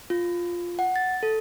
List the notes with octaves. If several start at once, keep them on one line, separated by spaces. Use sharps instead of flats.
F4
F#5
A6
A4